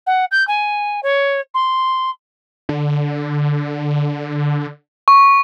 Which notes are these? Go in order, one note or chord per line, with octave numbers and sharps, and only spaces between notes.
F#5
G6
G#5
C#5
C6
D3
C#6